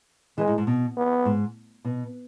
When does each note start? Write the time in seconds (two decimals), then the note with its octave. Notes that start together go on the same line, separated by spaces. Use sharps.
0.38 E3 G#3
0.47 G#2
0.58 G#2
0.67 B2
0.97 B3
1.25 G#2
1.85 B2